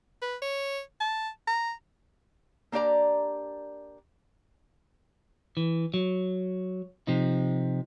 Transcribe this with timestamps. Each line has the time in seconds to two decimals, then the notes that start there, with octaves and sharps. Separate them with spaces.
0.22 B4
0.42 C#5
1.00 A5
1.47 A#5
2.72 A#3 D4 G4 D5 A#5
5.57 E3
5.94 F#3
7.07 C3 F3 D#4